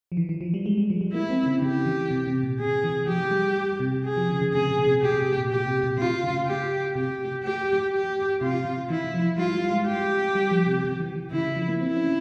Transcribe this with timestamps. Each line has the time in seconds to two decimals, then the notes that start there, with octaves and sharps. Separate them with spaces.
0.12 F3
0.17 E3
0.29 E3
0.41 F3
0.54 G3
0.66 G#3
0.78 G3
0.90 F3
1.01 G3
1.13 A#3 E4
1.30 C4
1.46 C#3
1.62 C#3 G4
1.86 E3
2.11 C3
2.27 C3
2.43 A#2
2.59 C3 G#4
2.84 E3
3.07 F3 G4
3.31 G3
3.80 C3
4.05 G#4
4.17 F3
4.29 C#3
4.41 C#3
4.53 C3 G#4
4.70 A#2
4.85 C3
5.02 A#2 G4
5.14 C3
5.37 A#2
5.50 A#2 G4
5.66 C3
5.83 A#2
5.98 C3 F4
6.24 C#3
6.47 G4
6.95 C3 G4
7.44 G4
7.92 G4
8.41 C3 F4
8.65 C3
8.89 E3 E4
9.14 F3
9.38 G3 F4
9.55 G3
9.71 G#3
9.86 G4
10.35 G3
10.51 F3
10.67 C3
10.84 C3
11.00 E3
11.16 E3
11.32 C#3 E4
11.45 E3
11.56 F3
11.68 A#3
11.81 C4 E4
11.97 C#4